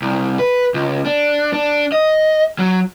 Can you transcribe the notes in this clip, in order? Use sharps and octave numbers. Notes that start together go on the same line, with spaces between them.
C2
B4
C#2
D4
D4
D#5
F#3